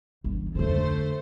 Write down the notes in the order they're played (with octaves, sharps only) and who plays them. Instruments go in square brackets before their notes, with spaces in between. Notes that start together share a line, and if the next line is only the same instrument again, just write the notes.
[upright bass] G1 E3
[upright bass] F2 D3 [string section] A3 C5